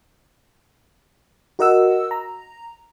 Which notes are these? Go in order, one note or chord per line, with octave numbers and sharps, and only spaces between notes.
F#4 A#4 D#5 F#5 E6
A#5